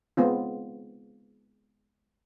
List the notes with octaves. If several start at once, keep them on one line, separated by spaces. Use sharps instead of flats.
G#3 B3 C4 F4